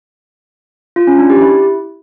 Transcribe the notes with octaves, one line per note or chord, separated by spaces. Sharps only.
F4
C#4
D4
G4
E4